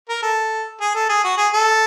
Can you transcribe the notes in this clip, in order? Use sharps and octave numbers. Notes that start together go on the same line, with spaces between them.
A#4
A4
G#4
A4
G#4
F#4
G#4
A4